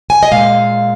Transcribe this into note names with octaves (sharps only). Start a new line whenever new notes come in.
G#5
D#5
A#2 G#3 F5